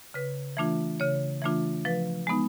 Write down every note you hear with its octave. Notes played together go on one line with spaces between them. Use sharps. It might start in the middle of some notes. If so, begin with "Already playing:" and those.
C#3 B4
E3 A3 D4 F4
C#3 C#5
E3 A3 D4 F4
F3 B4
G#3 B3 D#4